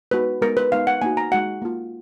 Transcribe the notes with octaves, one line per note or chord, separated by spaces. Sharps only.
G#3 B3 D#4 F#4 B4
G#3 B3 D#4 A#4
B4
G#3 B3 D#4 F5
F#5
A#3 D#4 F#4 G#5
A#5
G#3 D#4 F#4 F#5
A#3 F4